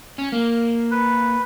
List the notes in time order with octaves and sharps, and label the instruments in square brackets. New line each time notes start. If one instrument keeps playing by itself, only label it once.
[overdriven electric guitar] C#4
A#3
[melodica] B4